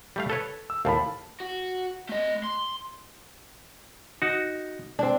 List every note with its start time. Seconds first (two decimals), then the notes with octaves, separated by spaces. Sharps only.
0.16 G3 A3 F5
0.30 A4 B4 C#5
0.70 E6
0.85 D#2 A2 F5 A5 B5
1.40 F#4
2.09 A3 D#5
2.44 C6
4.22 D#4 F#4
4.99 C4 D4